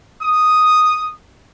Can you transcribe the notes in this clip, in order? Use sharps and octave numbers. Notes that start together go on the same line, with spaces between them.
D#6